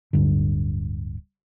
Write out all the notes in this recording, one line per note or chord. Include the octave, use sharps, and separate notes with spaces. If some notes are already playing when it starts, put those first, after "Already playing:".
D1 G2 D3